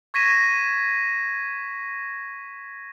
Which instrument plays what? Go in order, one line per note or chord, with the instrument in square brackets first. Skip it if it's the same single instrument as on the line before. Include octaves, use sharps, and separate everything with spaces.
[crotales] C#6 G#6 A#6 B6 D#7 E7